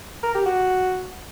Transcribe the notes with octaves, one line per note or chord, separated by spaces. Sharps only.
A#4
G4
F#4